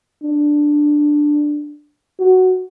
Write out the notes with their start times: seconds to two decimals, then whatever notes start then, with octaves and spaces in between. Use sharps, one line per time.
0.23 D4
2.19 F#4